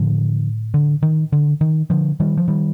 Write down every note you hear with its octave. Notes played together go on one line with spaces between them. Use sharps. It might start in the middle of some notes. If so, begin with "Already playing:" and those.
Already playing: A2 D3 F3
D3
D#3
D3
D#3
D3 F3
D#3 G3
F3
D#3 G3